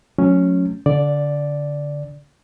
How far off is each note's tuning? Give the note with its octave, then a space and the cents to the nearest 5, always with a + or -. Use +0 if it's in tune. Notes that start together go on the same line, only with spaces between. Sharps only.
F#3 -30 A3 -10 C#4 +0
D3 -25 D5 +0